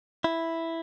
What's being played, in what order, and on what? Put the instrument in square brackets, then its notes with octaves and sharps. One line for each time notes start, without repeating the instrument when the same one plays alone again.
[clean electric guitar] E4